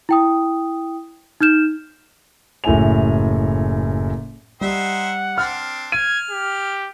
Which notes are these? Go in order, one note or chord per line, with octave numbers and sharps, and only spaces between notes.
E4 G5 D#6
D#4 F6 G6 E7
F#1 A2 E4 E5 G#5 F7
G3 D#4 C5 E5 F#5
C4 D4 F6
F6 G#6 D#7
G4